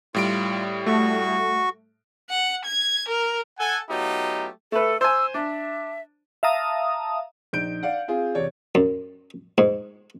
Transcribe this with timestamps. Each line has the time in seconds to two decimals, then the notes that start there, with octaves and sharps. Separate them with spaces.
0.14 A2 G3 F4 D7
0.86 A3 F#4 C#6
2.30 F#5
2.65 G#6
3.08 A#4
3.59 A4 F#5 G#5
3.89 F#3 A3 B3 D#4 F4 G4
4.72 A3 A4 B4
5.01 C5 G#5 E6
5.34 D4 E5
6.43 E5 F5 A5 A#5 D#6
7.53 A#1 D#4 G6 D7
7.83 D5 F5 F#5
8.08 C4 F4 G#4
8.35 E2 C3 C#5 D5
8.75 F#2
9.58 G#2